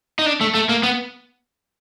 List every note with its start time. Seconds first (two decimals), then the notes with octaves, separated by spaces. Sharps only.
0.19 D#4
0.26 D4
0.41 A3
0.54 A3
0.69 A#3
0.83 B3